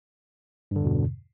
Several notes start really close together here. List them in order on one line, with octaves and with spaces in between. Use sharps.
G2 D3 E2 B2